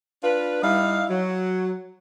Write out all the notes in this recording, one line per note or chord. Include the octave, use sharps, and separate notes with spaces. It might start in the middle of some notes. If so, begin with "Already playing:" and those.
D4 F4 B4
G3 D#4 E4 F5
F#3